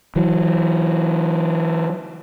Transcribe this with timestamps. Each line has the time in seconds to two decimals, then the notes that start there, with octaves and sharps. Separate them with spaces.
0.16 E3 F#3